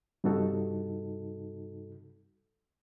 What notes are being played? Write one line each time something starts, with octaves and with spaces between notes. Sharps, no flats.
G2 C3 D#4 F#4 A4